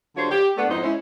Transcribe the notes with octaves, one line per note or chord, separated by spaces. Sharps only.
D3 F#3 G3 F4 C5 C#5
G4
A3 B3 D4
F2 G#2 D#4 E4 C5
G#3 C#4 E4